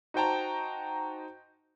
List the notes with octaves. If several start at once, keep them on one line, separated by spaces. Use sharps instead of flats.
D#4 F#4 C5 G5 A5 A#5